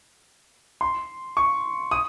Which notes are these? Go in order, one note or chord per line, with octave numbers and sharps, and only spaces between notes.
C6
C#6
D#6